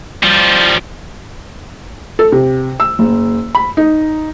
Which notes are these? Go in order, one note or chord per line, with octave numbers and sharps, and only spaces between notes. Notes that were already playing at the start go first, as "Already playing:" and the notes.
F3 G3
A4
C3
E6
F#1
B5
D#4